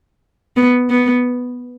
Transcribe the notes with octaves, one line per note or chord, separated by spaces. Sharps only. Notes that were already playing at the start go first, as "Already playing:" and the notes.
B3
B3